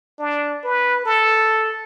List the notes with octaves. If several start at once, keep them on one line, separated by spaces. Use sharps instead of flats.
D4
B4
A4